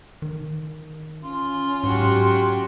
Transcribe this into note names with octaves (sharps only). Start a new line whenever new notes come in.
D#3
C#4 F4
G#2 F#3 F#4 G4